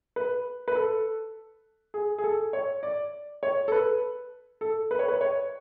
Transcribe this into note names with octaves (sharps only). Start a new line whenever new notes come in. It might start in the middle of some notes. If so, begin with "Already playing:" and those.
B4
B4
A4
G#4
G#4
A4
C#5
D5
C#5
A4
B4
A4
B4
C#5
B4
C#5